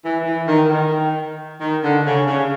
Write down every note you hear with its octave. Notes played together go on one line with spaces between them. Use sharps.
E3
E3
D#3
D#3
D#3
D3
C#3
C#3